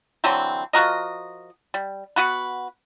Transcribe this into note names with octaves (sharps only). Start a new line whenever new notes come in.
D3 E3 F#3 C4
F3 F#4 A#4 D#5
G3
B3 F#4 B4